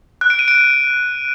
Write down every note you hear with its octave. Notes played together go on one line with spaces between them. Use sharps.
F#6
D7
D#7
D7